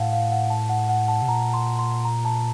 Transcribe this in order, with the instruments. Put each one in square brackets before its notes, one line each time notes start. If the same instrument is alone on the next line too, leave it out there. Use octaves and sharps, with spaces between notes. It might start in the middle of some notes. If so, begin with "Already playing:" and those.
Already playing: [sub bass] A2 [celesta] F5 F#5 A5
[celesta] F5
F#5
A5
F#5
F#5
A5
[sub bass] C3
[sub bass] A#2 [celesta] A#5
[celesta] C6
C6
A#5
A5